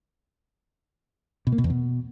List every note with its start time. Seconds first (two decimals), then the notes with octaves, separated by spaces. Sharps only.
1.47 B2
1.52 A#3
1.58 B2
1.64 E2
1.70 B2